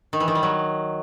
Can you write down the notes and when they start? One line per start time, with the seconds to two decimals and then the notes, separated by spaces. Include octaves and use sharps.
0.13 D#3
0.20 E3
0.28 D#3
0.35 G3
0.43 F#3